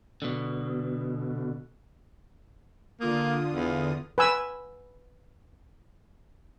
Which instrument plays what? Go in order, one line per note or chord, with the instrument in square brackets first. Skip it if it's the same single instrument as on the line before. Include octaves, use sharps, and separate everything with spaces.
[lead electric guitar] B2 D3
[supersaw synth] D3 F4 D#6 [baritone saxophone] A#3
[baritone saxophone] E2
[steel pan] B4 G#5 E6